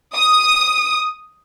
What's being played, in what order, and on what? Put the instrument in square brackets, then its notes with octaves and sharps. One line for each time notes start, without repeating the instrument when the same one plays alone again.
[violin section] D#6